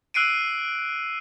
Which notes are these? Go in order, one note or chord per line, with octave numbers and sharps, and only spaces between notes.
E6 F#6 C7 D7 D#7